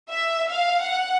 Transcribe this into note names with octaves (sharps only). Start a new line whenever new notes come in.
E5
F5
F#5